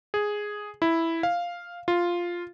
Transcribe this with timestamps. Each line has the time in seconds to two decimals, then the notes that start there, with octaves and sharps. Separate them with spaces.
0.14 G#4
0.82 E4
1.23 F5
1.88 F4